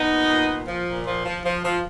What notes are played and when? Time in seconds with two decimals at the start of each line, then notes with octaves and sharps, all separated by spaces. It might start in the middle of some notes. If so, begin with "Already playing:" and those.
Already playing: B3 D#4
0.10 A#2
0.29 A#2
0.49 A#2
0.68 F3
0.87 A#2
1.06 F3
1.26 F3
1.45 F3
1.64 F3